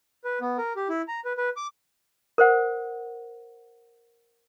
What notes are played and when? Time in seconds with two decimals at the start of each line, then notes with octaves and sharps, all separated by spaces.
0.24 B4
0.41 B3
0.58 A#4
0.76 G4
0.89 E4
1.08 A#5
1.25 B4
1.38 B4
1.56 D6
2.38 A#4 C5 F#5